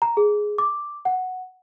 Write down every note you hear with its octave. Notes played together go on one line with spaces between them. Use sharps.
A#5
G#4
D6
F#5